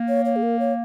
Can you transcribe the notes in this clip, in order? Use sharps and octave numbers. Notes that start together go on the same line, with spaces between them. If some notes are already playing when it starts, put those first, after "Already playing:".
Already playing: A#3
C#5
C#5
G#4
A#4
C#5